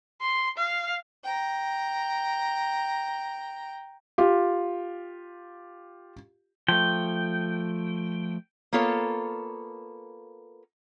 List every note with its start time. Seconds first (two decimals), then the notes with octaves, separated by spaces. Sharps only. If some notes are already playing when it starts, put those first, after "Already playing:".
0.21 C6
0.57 F5
1.23 G5 A#5
4.18 F4 G4
6.68 F3 A3 G5
8.73 A#3 B3 F4 A4 C#5